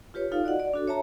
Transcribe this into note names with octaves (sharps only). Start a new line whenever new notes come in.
F4 G4 B4 C#5
D#4 F4 A4 F5
F#4 D5 D#5 F#5
D5
D4 F#4 A4
C#5 E5 A5 A#5